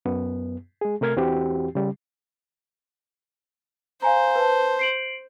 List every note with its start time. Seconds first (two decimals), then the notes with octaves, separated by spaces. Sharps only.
0.05 F#2 B3
0.81 G#3 G#4
1.01 C3 A3 A#4 F6 G#6
1.16 E2 E3 C4 F#4 G4
1.75 C#3 G3
4.02 C5 F5 G#5 A#5
4.36 B4 A5
4.79 C7 D7 F#7